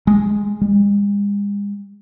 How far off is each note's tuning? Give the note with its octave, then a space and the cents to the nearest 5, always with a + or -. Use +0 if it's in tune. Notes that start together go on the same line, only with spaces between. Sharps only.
G#3 -5
G#3 -45